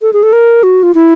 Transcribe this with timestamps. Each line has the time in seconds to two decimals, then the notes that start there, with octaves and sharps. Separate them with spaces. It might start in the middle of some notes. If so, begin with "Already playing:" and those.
0.02 A4
0.13 G#4
0.23 A4
0.33 A#4
0.63 F#4
0.83 F4
0.95 E4